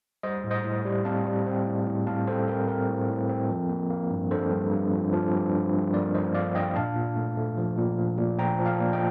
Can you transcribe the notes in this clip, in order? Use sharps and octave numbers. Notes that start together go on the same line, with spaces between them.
G3 C5 D#5
A2
C5 D#5
A2
G3
C4 F5 A5
G3
C4
A2
A2
A2 F5 A5
C4 A4 C5
C4 A#4
C4 A#4
A2
A2
C4
F3
A#3
A#3
G2
D4 A4 C5
G2
G2
F3
F3
G2
D4
G2
A#3 A#4 D5
F3 C5 D#5
G2 D5 F5
D4 D#5 G5
A#2 F5 A5
A#2
A3
A3
F3
A#2
F3
A#2
F3 G5 A#5
F3
F5 A5
A#2
D#5 G5